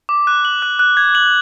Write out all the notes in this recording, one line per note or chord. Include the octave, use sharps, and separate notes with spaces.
D6
F#6
F#7
F#6
F#6
G#6
F#7